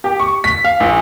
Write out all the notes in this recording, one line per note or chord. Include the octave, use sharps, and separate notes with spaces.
G4
C#6
B6
F5
A#1